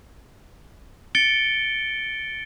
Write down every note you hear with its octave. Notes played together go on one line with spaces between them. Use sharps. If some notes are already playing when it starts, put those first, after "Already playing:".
A6 C#7 D7 G7